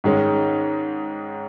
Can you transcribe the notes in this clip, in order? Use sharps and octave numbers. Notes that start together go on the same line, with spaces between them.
G#2 D#3 G#3 C#4